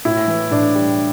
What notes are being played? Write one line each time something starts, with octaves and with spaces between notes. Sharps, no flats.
A2 E4
E3
A2 D4
G3